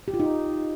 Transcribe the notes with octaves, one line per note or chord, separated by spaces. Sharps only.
G4
F4
D#4